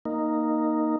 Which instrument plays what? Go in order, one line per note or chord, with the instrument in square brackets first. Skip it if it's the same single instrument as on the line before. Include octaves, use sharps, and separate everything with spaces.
[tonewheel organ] A#3 D#4